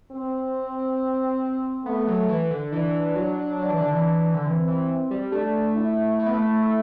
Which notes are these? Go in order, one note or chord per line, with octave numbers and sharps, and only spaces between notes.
C4
A3 B3
F#3
E3
D3
E3 D4
F#3
F#3
E3
D3
E3
D3
E3 C4
E3
G3
A3 D4
E4
A3
B3
A3
A3